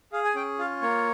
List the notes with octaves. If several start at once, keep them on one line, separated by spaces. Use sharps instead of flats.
G#4 F5
G#5
C#4 G5
F4 F5
A#3 C#5